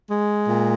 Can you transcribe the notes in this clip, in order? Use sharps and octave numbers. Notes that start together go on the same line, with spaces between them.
G#3
A#2